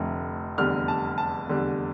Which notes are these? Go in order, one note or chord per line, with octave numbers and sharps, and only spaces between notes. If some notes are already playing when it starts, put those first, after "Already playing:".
Already playing: F1 F2 D3 A3
F1 E2 D3 G3 F6
A5
A5
F1 E2 D3 G3